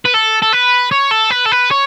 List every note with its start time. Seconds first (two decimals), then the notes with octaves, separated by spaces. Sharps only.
0.05 B4
0.14 A4
0.42 A4
0.53 B4
0.91 C#5
1.11 A4
1.31 B4
1.46 A4
1.52 B4
1.71 C#5